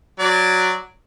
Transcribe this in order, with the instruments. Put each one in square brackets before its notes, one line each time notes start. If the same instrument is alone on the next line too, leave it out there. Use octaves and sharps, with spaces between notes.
[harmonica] F#3 D5